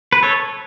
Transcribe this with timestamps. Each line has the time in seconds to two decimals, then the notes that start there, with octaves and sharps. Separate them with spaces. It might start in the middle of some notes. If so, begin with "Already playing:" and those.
0.13 B4
0.23 A4 C#5